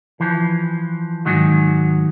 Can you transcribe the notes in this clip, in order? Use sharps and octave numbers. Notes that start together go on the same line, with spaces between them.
E3 F3
G#2 D#3 F#3